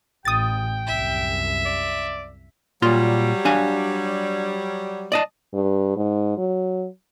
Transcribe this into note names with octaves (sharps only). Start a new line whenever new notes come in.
A1 G5 D#6 A6
C2 F#2 E5
D5
A#2 F#3 G3 F4 C6
D4 F5 G#5
D5 D#5 A5
G2
G#2
F#3